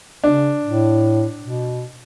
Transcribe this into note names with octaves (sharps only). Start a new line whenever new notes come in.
C#3 D4
A2
B2